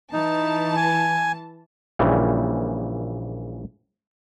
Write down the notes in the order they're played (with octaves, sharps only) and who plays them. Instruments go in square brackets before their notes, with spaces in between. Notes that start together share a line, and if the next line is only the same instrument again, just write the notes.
[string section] E3 A5 [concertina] D#4
[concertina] G#5
[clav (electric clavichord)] A#1 A#2 C#3 E3 G3